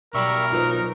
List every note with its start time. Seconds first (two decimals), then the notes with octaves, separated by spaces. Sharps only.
0.14 B1 F#3 G3 A#4 E5 C#6
0.52 D#4 F4 B4 C5